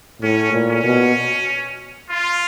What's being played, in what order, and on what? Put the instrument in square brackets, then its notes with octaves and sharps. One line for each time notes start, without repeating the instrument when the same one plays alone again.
[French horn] A2 [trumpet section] C#4
[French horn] A#2
[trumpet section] C#4
[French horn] B2
[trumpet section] F4